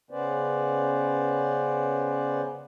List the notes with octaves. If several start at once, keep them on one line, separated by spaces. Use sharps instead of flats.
C#3 B3 C#4 B4 C5 D5